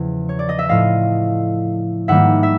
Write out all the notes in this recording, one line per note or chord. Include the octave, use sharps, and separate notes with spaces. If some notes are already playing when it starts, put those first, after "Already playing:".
Already playing: E2 C#3 F3
C#5
D5
D#5
E5
A2 F3 A3 D#5 F5
G#2 D#3 G3 A#3 E5 F#5
E5